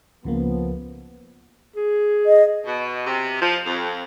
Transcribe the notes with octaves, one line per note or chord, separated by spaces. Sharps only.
C#2 C#3 F3 A#3 B3
G#4
D#5
B2
C3
F3
F2